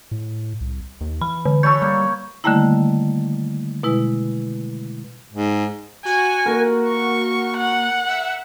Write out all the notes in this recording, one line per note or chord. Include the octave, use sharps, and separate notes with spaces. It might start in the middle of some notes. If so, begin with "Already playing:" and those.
A2
C2
D#2
E3 B5
D3
A4 B4 C#5 G6
G3 A#3
D3 D#3 G3 A3 A#3 E4
B2 G#3 E4 B4
G#2
F#4 G#5
A#3 A#4
C#6
F#5
E5